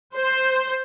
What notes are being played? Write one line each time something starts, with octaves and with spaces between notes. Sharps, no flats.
C5